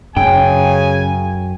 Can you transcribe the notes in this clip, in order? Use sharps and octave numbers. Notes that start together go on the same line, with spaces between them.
F#2 C#3 G5 G#5